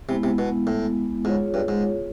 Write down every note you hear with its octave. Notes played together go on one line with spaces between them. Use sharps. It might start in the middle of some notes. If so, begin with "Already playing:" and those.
C3 G#3 B3 E4
C3
B2
A2
G#2 F4 G#4 C#5
G2
G#2